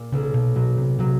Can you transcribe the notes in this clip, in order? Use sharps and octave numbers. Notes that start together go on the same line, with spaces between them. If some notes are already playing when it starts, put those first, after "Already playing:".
Already playing: A#2
B1 C#3
B2
B2 F#3
C3
C3 F#3